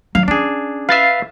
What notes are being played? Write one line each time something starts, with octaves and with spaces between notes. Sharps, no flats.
F#3 F5
C#4 D4 G#4
B4 E5 F5 A6 C7